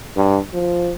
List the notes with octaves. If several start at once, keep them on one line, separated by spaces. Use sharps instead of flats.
G2
F3